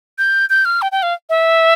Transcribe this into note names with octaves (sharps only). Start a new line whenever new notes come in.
G6
G6
F6
G5
G5
F5
E5